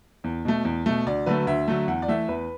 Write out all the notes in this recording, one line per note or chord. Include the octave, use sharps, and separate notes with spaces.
E2
B2 A3
E2
B2 A3
D2 D5
D3 F#3 A3 B4
D2 E5
D3 F#3 A3
E2 F#5
D5
E3 A3 E5
E2 B4